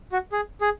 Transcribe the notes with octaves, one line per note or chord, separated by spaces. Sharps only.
F#4
G#4
G#4